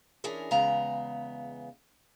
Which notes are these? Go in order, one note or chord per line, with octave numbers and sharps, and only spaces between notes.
E3 C#4 D4 G#4 A#4
E2 C#3 G#3 B3 F5 A#5